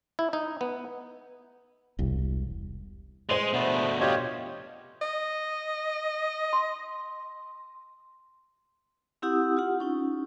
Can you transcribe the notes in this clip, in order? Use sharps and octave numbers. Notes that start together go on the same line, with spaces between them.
E4
D#4
B3
E1 C2
G#3 C5 C6 D#7 F7
B2 A3 B3 D4
F4 G4 C#5 D#5
D#5
C6
C4 E4 G4 F#5 D#6 E6
F4 G4 F#5
C#4 D#4